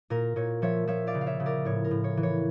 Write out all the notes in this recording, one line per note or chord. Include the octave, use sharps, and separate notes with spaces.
A#2 A#4
A#2 C#5
F3 C#5 E5
F3 C#5 E5
D5 F5
C#3
F5
C#5 E5
C#3
A#4 D5
A2 C#5
A#4
A2
C#5
E3
C#5